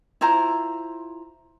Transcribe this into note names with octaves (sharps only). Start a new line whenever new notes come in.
E4 F4 C5 A#5